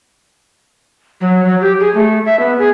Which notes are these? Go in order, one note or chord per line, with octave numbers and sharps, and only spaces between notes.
F#3
F#3
G4
G#4
A3
E5
B3
G#4